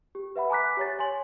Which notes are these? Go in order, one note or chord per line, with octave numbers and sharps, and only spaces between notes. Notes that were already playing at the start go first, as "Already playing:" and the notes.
G4
B4 E5 F#5 B5
G#5 A#5 D6 F#6 B6
G4 C#5 A6
C#5 G#5 C6 F#7